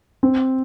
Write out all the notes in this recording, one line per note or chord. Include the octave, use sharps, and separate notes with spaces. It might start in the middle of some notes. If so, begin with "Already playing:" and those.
C4